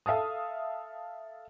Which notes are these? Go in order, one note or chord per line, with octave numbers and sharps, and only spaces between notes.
A4 E5 F5 A5 D#6